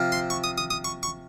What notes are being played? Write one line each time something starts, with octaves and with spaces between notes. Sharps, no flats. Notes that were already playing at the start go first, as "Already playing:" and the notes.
Already playing: C3 F3 C4 F4
C6
C#6
D#6
D#6
D#6
C#6
C#6